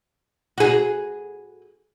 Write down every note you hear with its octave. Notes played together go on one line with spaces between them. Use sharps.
F#4 G#4